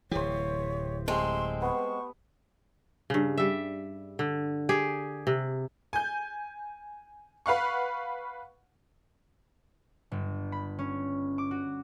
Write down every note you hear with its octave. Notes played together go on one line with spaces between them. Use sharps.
D1 E3 G4 C5 C#5
G#3 A3 C4 G4 C6
B3 C#6
G2 C#3
G3 E5
D3
G4 G#4
C3
G#5 G6
B4 F5 F#5 C#6
G1
B5
C#4
D6
F#4